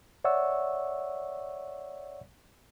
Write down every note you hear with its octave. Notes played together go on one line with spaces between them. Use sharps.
C#5 D5 E5 F#5 C#6 E6